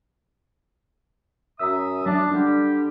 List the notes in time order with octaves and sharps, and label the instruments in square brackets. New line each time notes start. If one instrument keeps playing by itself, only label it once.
[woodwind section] F#2 E5 D#6 [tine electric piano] A#5 E6
[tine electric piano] F#3 [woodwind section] D4
[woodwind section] D3 G3 G4 [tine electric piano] D4